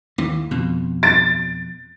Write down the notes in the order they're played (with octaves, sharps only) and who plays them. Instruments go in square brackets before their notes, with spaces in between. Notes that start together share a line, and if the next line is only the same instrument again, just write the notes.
[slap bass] D#2 E3
F2 B2
[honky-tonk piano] A6 D7